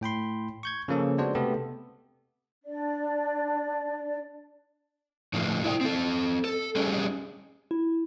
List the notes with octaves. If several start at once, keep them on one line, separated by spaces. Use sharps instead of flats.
A2 G5 B5 C6
C#6 G6 G#6
C#3 F3 A#3 C#4 A4
G#3 B3 D4 F#4 C5 D5
C3 A3 B3 G4 A4
D4 D5
A2 D3 F3 F4
E4 D5 F5 G5
C4 A4
A4
G3 C#4 D4 G4 G#4 D#5
E4